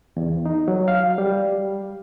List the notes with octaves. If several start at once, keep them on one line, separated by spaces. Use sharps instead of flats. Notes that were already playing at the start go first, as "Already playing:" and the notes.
E2
D#4
F#3
F5
G3